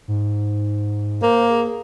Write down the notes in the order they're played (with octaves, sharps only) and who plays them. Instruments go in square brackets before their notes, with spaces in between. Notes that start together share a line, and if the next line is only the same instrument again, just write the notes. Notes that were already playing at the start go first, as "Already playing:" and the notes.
[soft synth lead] G#2
[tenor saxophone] A#3 [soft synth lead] C5
[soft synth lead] G#4